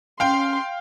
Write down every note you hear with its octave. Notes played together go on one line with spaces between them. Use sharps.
C#4 F5 G5 C6